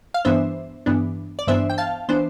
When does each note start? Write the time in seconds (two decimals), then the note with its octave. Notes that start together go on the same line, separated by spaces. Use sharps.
0.14 F5
0.25 G2 E3 B3 D4 C5 E5
0.86 G2 E3 B3 D4
1.39 D5
1.47 G2 E3 B3 D4 C5 E5
1.70 G5
1.78 F5 A5
2.09 E3 B3 D4 C5